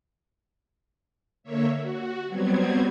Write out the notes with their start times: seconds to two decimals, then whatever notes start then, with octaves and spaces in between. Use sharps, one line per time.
1.43 D3 A#3 C#5 E5
1.77 F#4
2.26 F#3 G3 B3 C4 G#6